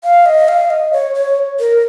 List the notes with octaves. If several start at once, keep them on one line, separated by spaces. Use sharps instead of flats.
F5
D#5
F5
D#5
C#5
C#5
A#4